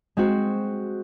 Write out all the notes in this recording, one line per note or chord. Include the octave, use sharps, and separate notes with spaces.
G#3 C4 F#4